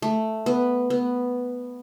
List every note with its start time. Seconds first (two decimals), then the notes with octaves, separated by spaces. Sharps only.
0.02 A3
0.46 B3
0.90 B3